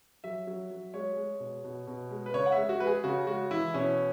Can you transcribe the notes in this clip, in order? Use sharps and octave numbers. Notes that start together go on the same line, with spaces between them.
F#3 E5
F#3
F#3
G#3 C#5
G#3
B2
B2
B2
G#3
B4
C#3 C#5
F#5
G#3 E5
F#4
G#3 B4
G#4
C#3 F#4
G#3 F#4
E3 E4
B2 C#4